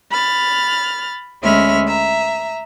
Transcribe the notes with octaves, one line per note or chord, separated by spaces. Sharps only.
B5 F6 A6
D2 G#3 C#4 E5 B5 F6
E5 A#5